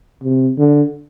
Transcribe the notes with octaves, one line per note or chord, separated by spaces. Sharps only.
C3
D3